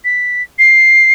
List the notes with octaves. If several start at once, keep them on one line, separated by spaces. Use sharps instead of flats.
B6
C7